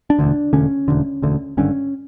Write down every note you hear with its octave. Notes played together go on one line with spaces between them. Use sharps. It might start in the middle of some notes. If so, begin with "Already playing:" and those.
D4
E1 D2 D3
E1 D2 D3 C#4
E1 D2 D3
E1 D2 D3
G#1 G2 D3 C#4